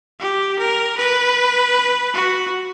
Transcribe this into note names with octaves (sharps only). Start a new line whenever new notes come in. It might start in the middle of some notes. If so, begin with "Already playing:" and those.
G4
A#4
B4
F#4